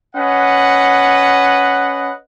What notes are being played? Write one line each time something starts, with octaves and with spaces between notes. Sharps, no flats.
C#4 B4 D#5 F#5